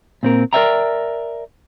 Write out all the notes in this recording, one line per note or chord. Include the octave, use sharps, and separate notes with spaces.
A#2 C4 A#4
A#4 C5 D5 E5 G5 A#5